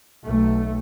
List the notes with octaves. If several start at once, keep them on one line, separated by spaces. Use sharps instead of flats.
B1 A3